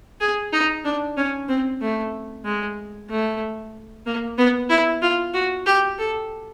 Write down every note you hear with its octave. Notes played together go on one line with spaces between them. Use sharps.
G#4
D#4
D4
C#4
C4
A3
G#3
A3
A#3
B3
E4
F4
F#4
G4
A4